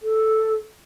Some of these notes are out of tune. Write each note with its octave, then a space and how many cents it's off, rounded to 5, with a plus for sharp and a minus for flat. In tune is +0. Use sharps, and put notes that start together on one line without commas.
A4 +0